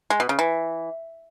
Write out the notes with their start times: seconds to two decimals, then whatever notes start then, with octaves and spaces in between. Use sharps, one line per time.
0.10 G#3
0.20 B2
0.29 C#3
0.39 E3